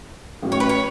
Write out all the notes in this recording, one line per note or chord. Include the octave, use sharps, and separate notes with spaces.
A1 A2 F#3 C#4
C#5
B4
C#5